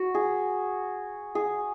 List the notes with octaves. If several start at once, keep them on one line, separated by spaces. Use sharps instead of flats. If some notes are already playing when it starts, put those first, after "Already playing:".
Already playing: F#4
G#4
G#4